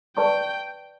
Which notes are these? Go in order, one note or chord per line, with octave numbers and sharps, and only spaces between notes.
B4 D5 G5 A5 C#6